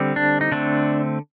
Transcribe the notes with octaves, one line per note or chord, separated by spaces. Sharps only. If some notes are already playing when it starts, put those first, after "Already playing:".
Already playing: D3 G3 C4
D4
D#4
D3 A3 C4 D4